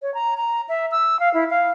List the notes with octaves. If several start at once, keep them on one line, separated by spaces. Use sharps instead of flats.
C#5
A#5
A#5
E5
E6
F5
E4
F5